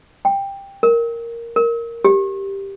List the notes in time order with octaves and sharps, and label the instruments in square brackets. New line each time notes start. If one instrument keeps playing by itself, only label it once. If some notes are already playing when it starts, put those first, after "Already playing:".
[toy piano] G5
A#4
A#4
G4